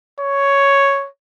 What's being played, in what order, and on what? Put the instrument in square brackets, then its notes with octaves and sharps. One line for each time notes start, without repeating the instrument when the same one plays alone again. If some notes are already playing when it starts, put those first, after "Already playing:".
[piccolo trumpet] C#5